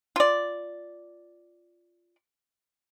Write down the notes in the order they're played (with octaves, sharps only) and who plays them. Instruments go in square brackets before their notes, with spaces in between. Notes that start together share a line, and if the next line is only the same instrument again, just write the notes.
[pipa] F4 D5